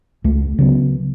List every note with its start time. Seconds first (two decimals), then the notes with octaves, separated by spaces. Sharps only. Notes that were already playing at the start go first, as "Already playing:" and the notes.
0.24 C#2 A3
0.59 C#3 F#3 B3